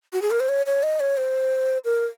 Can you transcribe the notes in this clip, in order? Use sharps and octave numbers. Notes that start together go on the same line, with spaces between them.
F#4
G#4
A#4
C5
C#5
C#5
D#5
C#5
C5
A#4